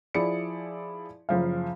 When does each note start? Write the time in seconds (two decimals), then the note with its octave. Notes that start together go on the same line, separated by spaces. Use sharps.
0.14 F3 E4 G#4 D5 C#7
1.29 F#1 F3 F5